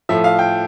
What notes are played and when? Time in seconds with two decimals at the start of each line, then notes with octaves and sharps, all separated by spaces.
0.09 A2 F3 E5
0.24 F5
0.39 G5